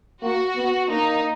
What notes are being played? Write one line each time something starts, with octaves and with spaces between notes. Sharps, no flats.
A#3 F#4
B3
A#3 D#4